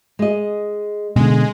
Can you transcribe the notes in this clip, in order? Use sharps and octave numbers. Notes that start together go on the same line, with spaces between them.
G#3 D#5
B2 D3 G#3